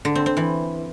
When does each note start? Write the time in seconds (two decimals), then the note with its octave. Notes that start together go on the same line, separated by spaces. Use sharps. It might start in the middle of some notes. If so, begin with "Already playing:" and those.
0.05 D3
0.15 C4
0.26 C4
0.37 E3